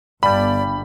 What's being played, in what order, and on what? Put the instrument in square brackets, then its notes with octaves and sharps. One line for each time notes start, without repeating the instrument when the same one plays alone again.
[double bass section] G1 [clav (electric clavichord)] G2 G3 [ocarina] D5 [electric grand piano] B5